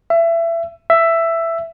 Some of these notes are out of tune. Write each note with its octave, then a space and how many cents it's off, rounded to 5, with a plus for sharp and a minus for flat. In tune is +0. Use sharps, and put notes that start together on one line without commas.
E5 +25
E5 +10